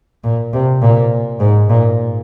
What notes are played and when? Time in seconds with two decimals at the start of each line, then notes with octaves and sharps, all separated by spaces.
0.24 A#2
0.53 C3
0.82 A#2
1.40 G#2
1.70 A#2